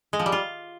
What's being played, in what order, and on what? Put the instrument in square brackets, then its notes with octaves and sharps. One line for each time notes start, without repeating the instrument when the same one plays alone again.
[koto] G#3
F3
G3
F4